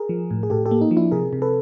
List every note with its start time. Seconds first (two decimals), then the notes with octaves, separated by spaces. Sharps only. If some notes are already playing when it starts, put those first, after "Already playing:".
Already playing: G#4 A#4
0.09 F3
0.31 A2
0.43 G#4
0.50 A2 G4 A4
0.66 G4 A4
0.71 A#3
0.81 D#4
0.91 F3
0.97 D4 E4
1.11 C3 G#4 A#4
1.33 C3
1.42 A4 B4